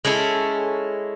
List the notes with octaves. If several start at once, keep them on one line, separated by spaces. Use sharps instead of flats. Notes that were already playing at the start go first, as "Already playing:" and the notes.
G#3 C#4 E4 A4